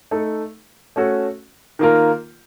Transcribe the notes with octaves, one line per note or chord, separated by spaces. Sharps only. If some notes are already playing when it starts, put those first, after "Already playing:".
A3 D#4 A4
A3 C#4 F#4 A4
D#3 A#3 F4 A#4